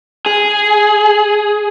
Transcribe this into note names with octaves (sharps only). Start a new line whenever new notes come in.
G#4